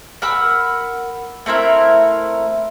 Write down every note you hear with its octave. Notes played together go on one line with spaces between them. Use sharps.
A#4 F#5 B5 E6
A3 C4 E4 A#4